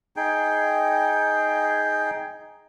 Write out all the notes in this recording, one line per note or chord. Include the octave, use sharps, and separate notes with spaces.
D#4 G#4 G5